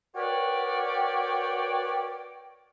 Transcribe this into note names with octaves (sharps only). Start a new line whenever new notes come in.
F#4 A#4 B4 C#5 D5 G5